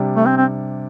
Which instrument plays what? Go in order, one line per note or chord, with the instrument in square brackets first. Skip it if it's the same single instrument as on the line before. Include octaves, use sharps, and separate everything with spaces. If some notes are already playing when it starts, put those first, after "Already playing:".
Already playing: [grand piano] C3 G3 D4
[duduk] A3
C4
C4